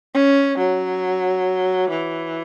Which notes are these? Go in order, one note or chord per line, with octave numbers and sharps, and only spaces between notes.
C#4
F#3
E3